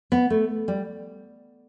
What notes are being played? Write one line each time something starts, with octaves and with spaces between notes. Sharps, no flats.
B3
A3
G3